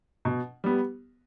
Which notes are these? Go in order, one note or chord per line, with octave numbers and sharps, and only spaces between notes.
B2
G3 B3